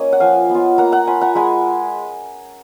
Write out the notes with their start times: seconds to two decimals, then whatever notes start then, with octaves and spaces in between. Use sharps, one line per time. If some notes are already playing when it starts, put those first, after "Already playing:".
Already playing: A#3 C#4 C#5 D#5
0.13 F#5
0.20 F3 F5 G#5
0.49 B3 F4
0.78 A#3 F#5 A#5
0.92 F#5 A#5
1.07 F4 G#5 B5
1.21 F#5 A#5
1.35 G#3 G#5 B5